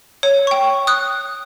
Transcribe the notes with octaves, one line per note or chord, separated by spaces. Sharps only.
C#5
G5 C#6
D#6 F#6